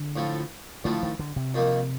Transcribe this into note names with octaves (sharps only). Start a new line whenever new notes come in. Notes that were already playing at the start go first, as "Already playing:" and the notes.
Already playing: D3
A2 F3 A3
A2 D3 F3 A3
D#3
D3
C3
F2 D#3 A#3